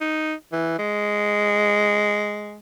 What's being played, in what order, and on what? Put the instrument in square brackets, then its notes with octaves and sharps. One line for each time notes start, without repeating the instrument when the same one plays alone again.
[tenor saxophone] D#4
E3
G#3